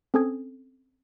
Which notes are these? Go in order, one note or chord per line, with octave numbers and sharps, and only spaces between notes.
C4 C#4 A4 G#5 D#6 G#6